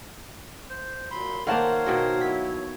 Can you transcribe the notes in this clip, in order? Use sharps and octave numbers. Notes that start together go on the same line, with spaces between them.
C5
A#2 F#3 B5 C6
D#3 A#3 A#4 C5 C#5 F5 F#5 A5
B2 D#3 F#4
F#3 E4 B6